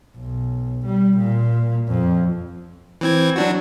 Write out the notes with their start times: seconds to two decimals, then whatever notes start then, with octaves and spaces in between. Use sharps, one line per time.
0.16 B1
0.86 G3
1.18 A#2
1.88 F2
3.01 E3 C4 G#6
3.36 F#3 D4 F#4